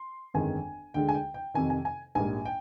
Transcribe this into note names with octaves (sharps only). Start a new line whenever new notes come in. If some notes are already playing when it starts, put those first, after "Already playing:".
Already playing: C6
G1 F2 D#3 G#3 G#5
D2 D3 G#3 G5
G#5
G5
G5
F2 C3 D#3 G#5
G#5
G#5
A#1 G#2 G3 A#3 G#5
G5